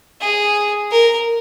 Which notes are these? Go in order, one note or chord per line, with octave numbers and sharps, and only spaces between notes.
G#4
A#4